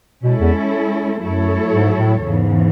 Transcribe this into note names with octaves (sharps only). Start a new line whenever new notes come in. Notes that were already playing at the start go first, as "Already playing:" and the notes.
B2 G#3 C#4 E4 A4
E2
F#2 F#3 A3 E4 A4 C#5
G#2
A2
E2 G#2 C#3 E3